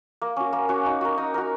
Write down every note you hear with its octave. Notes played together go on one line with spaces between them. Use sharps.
A#3
C#4 F#4
A#3
C#4 F#4
D#4
F#4 A#4
D#4
F#4 A#4